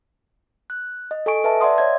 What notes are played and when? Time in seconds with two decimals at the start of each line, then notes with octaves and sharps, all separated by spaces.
0.70 F#6
1.11 D#5
1.26 A4 D#5 G#5 C#6 D7
1.44 B4 E5 A5
1.61 D5 E5 F#5 C6 D#6
1.78 C#5 D#5 G#6